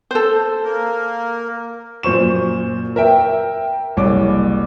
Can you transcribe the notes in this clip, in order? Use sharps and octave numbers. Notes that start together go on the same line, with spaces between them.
A4 C5
A#3 A#4
F#2 A#2 C5 C#6 E7
A#4 E5 G5
F#1 C2 C#5 D6